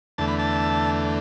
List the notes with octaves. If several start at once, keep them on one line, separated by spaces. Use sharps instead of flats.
E2 D3 A3 A5
B5
A5